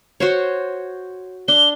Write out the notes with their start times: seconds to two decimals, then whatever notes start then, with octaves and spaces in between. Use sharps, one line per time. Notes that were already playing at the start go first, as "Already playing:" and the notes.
0.20 F#4 C5 C#5
1.48 D4 G7